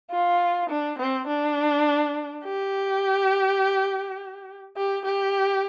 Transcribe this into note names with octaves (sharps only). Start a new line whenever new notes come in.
F4
D4
C4
D4
G4
G4
G4